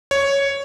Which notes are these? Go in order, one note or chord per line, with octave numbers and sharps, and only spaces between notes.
C#5